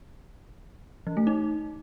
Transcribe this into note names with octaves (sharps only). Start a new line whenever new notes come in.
E3
A3
D#4